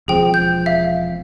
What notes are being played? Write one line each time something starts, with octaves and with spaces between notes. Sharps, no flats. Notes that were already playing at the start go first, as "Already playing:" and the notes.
E1 F3 C4 G#4 G5
G6
E5 F5